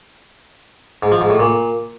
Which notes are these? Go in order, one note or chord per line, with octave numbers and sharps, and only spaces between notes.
G#2
F3
G#2
A2
A#2